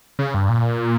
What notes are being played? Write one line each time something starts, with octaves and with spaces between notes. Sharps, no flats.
C#3
G2
A#2